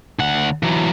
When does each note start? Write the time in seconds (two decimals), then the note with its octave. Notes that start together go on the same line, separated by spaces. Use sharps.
0.19 D2 F#5
0.63 E3 F#3